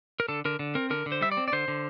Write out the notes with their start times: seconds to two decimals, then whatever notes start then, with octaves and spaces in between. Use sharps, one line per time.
0.20 A#4
0.28 D3 A4
0.45 D3 A#4
0.59 D3
0.75 C4 A#4
0.90 D3 A#4
1.06 D3
1.12 C5
1.21 G3 E5
1.32 D5
1.37 C4
1.48 D5
1.53 D3 C5
1.68 D3